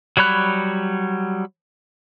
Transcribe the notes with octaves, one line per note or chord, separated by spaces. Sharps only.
F#3 G3 C#5 B5 F#6